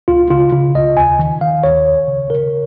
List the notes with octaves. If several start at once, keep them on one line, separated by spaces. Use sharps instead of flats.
C#2 F4
C#3 F4
C#3 F4
C#2 D#5
D#2 G#5
D#3
D#3 F5
D#2 C#5
C#2
C#3
C#3 A#4